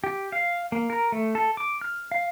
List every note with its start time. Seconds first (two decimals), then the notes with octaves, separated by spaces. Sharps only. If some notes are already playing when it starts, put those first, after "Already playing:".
0.04 G4
0.32 F5
0.72 A#3
0.90 A#4
1.12 A3
1.35 A4
1.57 D6
1.81 F6
2.12 F5